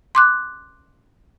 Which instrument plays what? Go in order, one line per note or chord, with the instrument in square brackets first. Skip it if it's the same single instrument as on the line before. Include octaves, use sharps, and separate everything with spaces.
[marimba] C6 D6 F#6